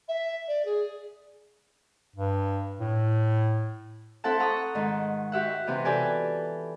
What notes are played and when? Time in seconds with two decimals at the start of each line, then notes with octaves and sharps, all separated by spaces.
0.08 E5
0.47 D5
0.65 G#4
2.16 G2
2.80 A2
4.24 C4 E4 A4 F#5 A5
4.39 A4 F#5 A#5 C#6 D#6
4.75 G#2 D#3
5.32 F#4 G4 E5 F#5
5.67 C3 E3 B3 G4
5.85 G4 A4 B4 D5 G#5